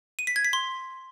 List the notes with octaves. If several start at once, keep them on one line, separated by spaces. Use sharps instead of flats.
D#7
B6
G#6
B6
C6